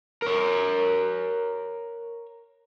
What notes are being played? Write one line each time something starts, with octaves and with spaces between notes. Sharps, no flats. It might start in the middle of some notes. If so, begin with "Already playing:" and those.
A#4 C#5